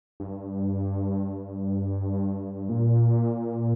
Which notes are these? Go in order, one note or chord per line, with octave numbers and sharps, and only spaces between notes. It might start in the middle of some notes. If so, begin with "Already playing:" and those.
G2
A#2